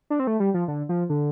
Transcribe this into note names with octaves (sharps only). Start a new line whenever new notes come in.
D4
C4
A3
G3
F3
D3
F3
D3